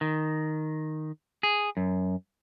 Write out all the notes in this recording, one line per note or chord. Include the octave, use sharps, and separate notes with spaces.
D#3
G#4
F#2